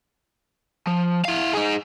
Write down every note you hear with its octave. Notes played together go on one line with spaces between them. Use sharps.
F3
E4 F5
D#4 G#4